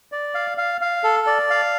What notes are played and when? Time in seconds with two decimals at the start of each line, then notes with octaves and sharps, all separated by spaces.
0.12 D5
0.35 F5
0.58 F5
0.81 F5
1.04 A4
1.27 D5
1.50 F5